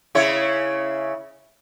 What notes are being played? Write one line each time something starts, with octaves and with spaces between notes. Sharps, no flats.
C#3 E4 C#5